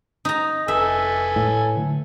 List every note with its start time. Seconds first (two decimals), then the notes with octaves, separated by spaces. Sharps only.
0.25 D#4 A#5
0.68 F1 A4 B4 E5 G#5
1.36 A2
1.75 D3 F#3